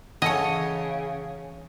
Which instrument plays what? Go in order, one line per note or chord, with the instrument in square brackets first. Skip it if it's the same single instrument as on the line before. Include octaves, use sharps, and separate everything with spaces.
[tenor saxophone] C#3 [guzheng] E3 A4 C#5 [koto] D#5 [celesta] F#5 A5 C#7